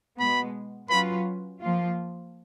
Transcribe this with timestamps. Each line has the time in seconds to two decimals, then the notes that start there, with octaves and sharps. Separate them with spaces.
0.20 B2 G#3 B3 B5
0.90 F#3 C#4 F4 B4 B5
1.61 F3 A#3 F4